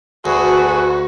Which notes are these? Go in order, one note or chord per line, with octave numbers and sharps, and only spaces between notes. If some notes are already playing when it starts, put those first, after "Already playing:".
D2 F#4 G#4 A4 B4